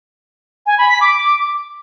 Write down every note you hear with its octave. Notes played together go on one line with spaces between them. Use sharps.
G#5
B5
B6
D6